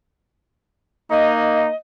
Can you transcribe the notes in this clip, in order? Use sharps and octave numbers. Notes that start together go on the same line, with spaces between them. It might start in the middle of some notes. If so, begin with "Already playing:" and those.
A#3 D#4 D#5